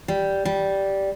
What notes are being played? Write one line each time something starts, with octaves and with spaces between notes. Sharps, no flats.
G3
G3